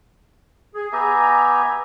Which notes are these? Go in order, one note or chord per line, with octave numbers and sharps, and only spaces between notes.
G#4
B3 G4 E5 G#5 A#5